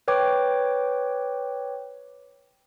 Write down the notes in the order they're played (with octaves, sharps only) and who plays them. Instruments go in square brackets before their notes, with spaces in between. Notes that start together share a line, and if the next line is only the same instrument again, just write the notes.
[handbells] B4 C#5 G5 D6